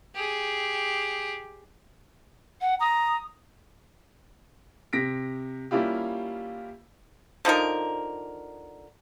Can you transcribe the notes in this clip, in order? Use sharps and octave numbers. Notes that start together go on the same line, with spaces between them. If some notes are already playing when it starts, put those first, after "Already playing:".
G4 G#4
F#5
A#5 D#6
C3 A#6 B6 D7
G3 A#3 C#4 E4 F4 G4
D3 F3 D#4 A#4